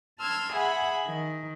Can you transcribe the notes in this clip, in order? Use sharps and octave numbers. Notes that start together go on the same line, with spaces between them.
A5 C6 E6 F6 G#6
G#4 E5 F#5 G#5 B5
D#3